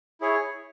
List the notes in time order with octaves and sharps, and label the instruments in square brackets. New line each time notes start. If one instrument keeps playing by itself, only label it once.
[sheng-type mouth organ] E4 G#4 C#5